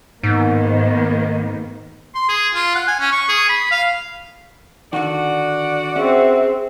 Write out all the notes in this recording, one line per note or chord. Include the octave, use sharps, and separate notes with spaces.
G#2 D#3 A#3 B3
C6
G#4
F4
F#5
G#5
C#4
C#6
G#4
B5
F5
D3 D#3 F#4 D5 F#5
C4 C#4 G#4 E5